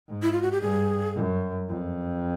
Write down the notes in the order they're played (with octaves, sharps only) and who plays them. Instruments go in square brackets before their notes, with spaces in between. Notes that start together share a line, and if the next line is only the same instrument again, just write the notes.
[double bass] G#2
[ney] E4
F4
F#4
G4
[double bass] G2 [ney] G#4
[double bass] F#2
F2